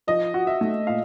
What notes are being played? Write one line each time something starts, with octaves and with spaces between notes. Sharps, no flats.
F3 D#5
F#4
E5
A3
A#2 F5